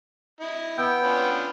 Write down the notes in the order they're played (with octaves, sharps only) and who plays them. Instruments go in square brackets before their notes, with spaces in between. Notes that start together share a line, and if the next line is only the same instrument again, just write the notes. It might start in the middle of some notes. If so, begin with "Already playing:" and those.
[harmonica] E4 D#5
[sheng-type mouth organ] B3 G5 [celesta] B5 E6 G6
[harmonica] C#4 D4 F4